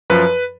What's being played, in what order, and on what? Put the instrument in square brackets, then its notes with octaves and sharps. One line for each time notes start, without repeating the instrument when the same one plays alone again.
[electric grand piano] F#2 F3 B4